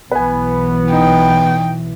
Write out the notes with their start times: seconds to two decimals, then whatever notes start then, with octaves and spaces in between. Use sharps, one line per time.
0.11 B1 E3 B3 B4 G#5
0.92 D#4 G5